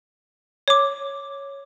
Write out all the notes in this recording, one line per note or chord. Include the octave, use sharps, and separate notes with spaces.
C#5 D6